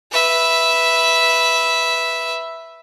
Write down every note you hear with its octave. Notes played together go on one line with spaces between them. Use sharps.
B4 E5